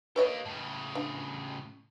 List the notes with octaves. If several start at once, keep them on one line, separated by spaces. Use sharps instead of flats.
A#3 G4 B4 C#5 D#5
A2 C#3
D4